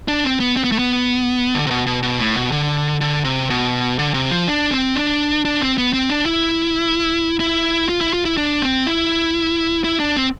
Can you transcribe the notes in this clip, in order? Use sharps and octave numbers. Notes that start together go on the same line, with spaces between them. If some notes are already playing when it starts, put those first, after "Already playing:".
D4
C4
B3
C4
B3
A3
B3
D3
C3
B2
B2
B2
A2
B2
D3
D3
C3
B2
D3
C3
F3
D4
C4
D4
D4
C4
B3
C4
D4
E4
E4
F4
E4
F4
E4
D4
C4
E4
E4
D4
C4